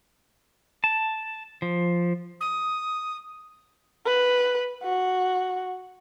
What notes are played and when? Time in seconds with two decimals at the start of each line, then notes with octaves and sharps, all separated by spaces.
0.84 A5
1.62 F3
2.40 D#6
4.06 B4
4.83 F#4